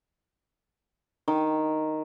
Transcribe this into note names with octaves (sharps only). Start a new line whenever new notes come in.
D#3